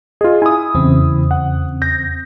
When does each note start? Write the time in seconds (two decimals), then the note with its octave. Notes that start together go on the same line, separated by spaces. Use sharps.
0.21 F4 G#4 D#5
0.42 E4 G#5 D#6
0.75 E2 C#3 C4
1.31 F#5
1.82 G6 A#6